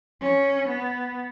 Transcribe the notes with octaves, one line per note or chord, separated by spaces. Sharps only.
C#4
B3